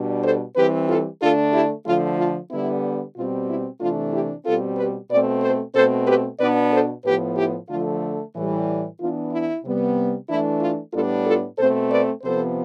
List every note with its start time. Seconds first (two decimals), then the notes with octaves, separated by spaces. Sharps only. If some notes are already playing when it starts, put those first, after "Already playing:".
Already playing: B2 G3 D4
0.24 A4 C5
0.56 E3 G3 C4 G4 B4
0.88 F4 A4
1.21 D3 A3 D4 F4 A4
1.53 E4 G4
1.86 D3 F3 A3 F4
2.18 F4
2.51 D3 G3 B3 E4
3.16 B2 G3 C4 F4
3.49 E4
3.80 C3 E3 A3 D4 F4
4.13 E4 G4
4.45 B2 G3 C4 F4 A4
4.78 G4 B4
5.10 B2 A3 C4 B4 D5
5.42 A4 C5
5.75 B2 A3 C4 A4 C5
6.08 G4 B4
6.40 B2 B3 D4 B4 D5
6.72 A4 C5
7.05 A2 F3 B3 G4 B4
7.37 E4 G4
7.69 D3 F3 A3 F4
8.34 A2 E3 G3
9.00 E3 B3 D4 F4
9.31 E4
9.64 C3 G3 B3
10.29 E3 A3 D4 E4
10.61 F4
10.93 A2 G3 B3 D4 F4 A4
11.26 F4 A4
11.58 B2 A3 C4 A4 C5
11.92 B4 D5
12.23 C3 F3 B3 A4 C5